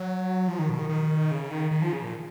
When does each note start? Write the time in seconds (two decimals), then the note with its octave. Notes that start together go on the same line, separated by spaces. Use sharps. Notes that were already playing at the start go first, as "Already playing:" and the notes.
Already playing: F#3
0.48 F3
0.59 D#3
0.69 B2
0.79 D#3
0.89 D#3
1.31 C#3
1.51 D#3
1.71 D#3
1.82 F3
1.93 C#3
2.02 A#2